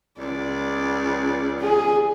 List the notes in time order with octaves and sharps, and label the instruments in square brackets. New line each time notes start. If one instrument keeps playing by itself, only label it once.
[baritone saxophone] C#2 [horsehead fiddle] D5
[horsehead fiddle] G#4